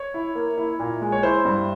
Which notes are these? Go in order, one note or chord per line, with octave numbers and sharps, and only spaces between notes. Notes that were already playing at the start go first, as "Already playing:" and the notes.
Already playing: C#5
E4
A#3
E4
A#2
G#3
C#5
E4 C5
G2